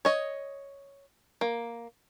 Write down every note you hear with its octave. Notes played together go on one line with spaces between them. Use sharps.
C#5 D#5
A#3